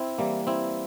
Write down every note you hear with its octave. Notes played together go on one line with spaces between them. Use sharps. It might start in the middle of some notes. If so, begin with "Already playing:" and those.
Already playing: C4 E4
E3 G3 A#3
C4 E4